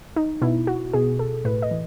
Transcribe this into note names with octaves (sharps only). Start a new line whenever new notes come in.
D#4
B2 E4
F#4
B2 G#4
A4
A2 B4
D#5
E3